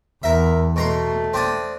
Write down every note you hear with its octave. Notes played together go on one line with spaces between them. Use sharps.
E2 A#4 E5
B2 A3 A#5 C6
C4 D4 D#6